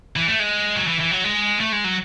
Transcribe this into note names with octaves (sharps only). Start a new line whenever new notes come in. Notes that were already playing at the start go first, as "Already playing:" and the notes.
E3
A3
G#3
F#3
E3
E3
F#3
G#3
A3
G#3
F#3